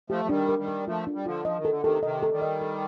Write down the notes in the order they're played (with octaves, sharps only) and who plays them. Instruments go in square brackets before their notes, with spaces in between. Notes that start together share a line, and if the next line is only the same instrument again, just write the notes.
[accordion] F3 A3 [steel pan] G4
[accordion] F3
[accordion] D#3 G3 [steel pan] D4
[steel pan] A#4
[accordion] D#3 G3
[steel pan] A#4
[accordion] F3 A3 [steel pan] F4
[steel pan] D4
[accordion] G3
[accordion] D3 F3 [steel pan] F4
[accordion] F3 [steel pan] D#5
[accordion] D#3
[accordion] D3 [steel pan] A4
[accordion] C3 D#3 [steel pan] A4
[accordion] C3 D#3 [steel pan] D#5
[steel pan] A4
[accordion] D#3 G3
[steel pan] D#5
A4